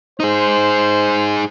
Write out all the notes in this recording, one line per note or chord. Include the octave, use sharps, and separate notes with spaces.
D#4 G#4 C5